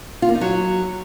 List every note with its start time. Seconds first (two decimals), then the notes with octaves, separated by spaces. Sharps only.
0.22 F4
0.29 A#3
0.35 D#4
0.41 F#3